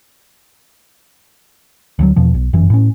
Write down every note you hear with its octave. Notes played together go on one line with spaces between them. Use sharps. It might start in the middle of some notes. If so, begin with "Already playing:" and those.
D2 E3 F#3
E2 B2 F3
B1
G1 F#2 E3
A2 C#4